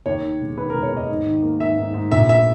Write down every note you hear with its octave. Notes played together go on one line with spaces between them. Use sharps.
D#2 C#5
D#3
E1
D#3 B4
A#4
E1
C#5
D#2 D#5
G#2
D#3
A#3
G#2 E5
G#2
G#2
A#1 E5
E5